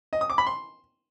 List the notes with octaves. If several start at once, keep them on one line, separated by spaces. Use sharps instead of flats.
D#5
D#6
D6
B5
C6